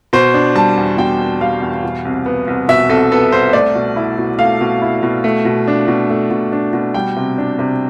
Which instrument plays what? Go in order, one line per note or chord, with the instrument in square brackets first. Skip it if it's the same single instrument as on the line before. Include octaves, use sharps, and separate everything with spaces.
[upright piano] B2 C5
D4
G3 A5
E2
B2 G5
D4
G3 F5
E2
B2
C2
B3
C2
B2 E5
C2 A4
B3 A4
C2 C5
A3 D5
B2
E4
B2
A3 F5
B2
E4
B2
A3
B2
D4
B2
A3
B2
D4
B2
G3 G5
C3
D4
C3